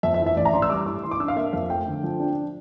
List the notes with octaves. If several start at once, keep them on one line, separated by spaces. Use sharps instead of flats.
F2 E5
E5
E3
E5
A1 D5
A#5
A1 C6
E6
G3 D6
A2 D6
E3 C6
D6
D4 E6
F5
A#3 E5
F2 F5
A3 G5
D3
F3
D4